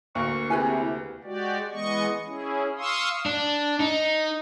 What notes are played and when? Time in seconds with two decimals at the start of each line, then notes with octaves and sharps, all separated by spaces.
0.15 D2 A#3 C#6
0.50 C3 E4 G4 G#4 B4 G#5
1.24 G#3 F#4 G4 D5
1.71 E3 G#3 B3 D#5 C#6
2.26 C#4 E4 G#4
2.78 F5 C6 C#6 D#6 E6
3.26 D4
3.80 D#4